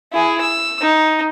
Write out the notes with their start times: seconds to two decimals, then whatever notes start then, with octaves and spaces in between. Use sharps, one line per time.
0.12 E4 G#4
0.41 E6
0.81 D#4